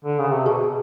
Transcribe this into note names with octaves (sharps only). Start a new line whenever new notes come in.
D3
C#3
C3
B2 G#4